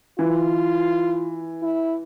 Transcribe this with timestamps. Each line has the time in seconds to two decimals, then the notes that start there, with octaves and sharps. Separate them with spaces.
0.19 E3 F4
1.62 E4